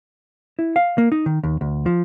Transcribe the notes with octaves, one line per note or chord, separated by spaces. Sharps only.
E4
F5
A#3
D#4
D#3
D#2
D2
F3